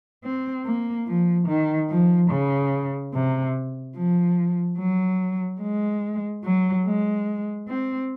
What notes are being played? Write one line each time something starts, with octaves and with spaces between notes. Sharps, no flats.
C4
A#3
F3
D#3
F3
C#3
C3
F3
F#3
G#3
F#3
G#3
C4